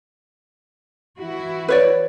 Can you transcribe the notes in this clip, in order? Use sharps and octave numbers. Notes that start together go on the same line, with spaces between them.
E3 E4 F#4
B4 C#5 D5